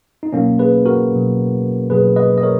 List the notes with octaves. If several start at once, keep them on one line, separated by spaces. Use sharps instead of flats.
D#4
B2 F#3 A#3 C#4
G#4 B4
F#4 A#4
B2 F#3
B2 F#3 G#4 B4
B4 D#5
D#5
A#4 C#5